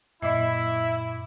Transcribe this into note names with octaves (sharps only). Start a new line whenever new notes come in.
F#2 A#2 E4 D#5 E5 D6